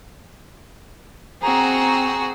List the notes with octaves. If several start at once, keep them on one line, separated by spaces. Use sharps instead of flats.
C4 F#4 G#4 A#5